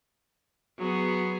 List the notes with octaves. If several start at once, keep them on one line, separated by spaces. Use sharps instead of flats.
F#3 B3 G#4